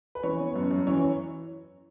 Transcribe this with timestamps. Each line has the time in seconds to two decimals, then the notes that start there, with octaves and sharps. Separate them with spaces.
0.15 B4
0.23 E3 C#5
0.39 B3
0.56 F#2
0.71 F#2
0.87 E3 C#5